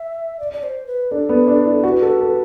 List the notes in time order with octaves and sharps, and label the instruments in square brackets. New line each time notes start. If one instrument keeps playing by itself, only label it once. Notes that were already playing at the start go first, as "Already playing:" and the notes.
Already playing: [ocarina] E5
D5
D5
C5
B4
[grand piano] D4 [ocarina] A4
[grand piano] B3
D4
E4
[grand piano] F#4 [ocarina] B4
[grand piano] A4
A4